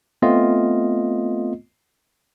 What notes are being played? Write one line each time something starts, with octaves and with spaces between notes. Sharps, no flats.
A3 B3 C4 F4 D#5